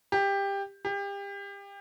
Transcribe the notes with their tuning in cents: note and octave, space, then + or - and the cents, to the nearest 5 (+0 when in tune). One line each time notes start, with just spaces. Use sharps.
G4 +15
G4 +30